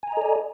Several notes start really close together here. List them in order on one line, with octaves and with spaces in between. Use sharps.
G#5 A#5 D#5 A4 D5